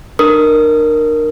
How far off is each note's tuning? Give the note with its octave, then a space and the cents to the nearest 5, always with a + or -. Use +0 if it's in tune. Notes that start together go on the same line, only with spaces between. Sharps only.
D4 +45 A#4 +0 D#6 +10